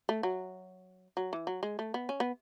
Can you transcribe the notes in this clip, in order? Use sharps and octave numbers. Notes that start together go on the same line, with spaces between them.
A3
F#3
F#3
E3
F#3
G#3
A3
B3
C#4
B3